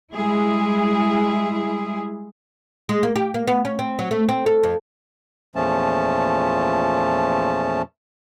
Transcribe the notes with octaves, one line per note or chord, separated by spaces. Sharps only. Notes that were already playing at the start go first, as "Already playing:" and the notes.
G3 G#3 E4 G#4
G#3
A#3
G4
A#3
B3
C#4
C4
F#3
A3
C4
A4
F2
E2 A#2 F3 A3 C#4 A5